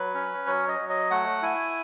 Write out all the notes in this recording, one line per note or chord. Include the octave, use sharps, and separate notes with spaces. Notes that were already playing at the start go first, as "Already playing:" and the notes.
Already playing: F#3 B4
C#4
F#3 C#5
D#5
F#3
D#5
A3 F#5
E4 G#5